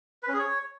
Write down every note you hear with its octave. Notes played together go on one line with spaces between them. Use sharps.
B4
C#4
G#4
C#5